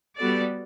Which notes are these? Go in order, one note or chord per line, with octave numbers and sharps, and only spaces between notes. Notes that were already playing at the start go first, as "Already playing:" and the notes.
G3 B3 F#4 A4 D5